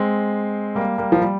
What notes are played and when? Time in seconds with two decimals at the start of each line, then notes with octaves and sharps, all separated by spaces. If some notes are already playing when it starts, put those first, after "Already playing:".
Already playing: G#3 C4
0.75 G3 A#3
0.98 G3 A#3
1.12 F3
1.22 G3